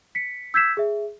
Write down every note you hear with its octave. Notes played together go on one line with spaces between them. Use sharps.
B6 C#7
E6 G6 G#6 B6 C7 E7
G#4 E5